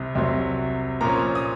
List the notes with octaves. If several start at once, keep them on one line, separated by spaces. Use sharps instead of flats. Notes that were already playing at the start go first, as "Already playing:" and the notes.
Already playing: C2 C3
C2 C3 F#3
A#2 F3 A#3 C#4 A#5
D#6